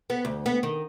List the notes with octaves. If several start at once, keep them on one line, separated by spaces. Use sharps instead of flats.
B3
D2
B3
D#3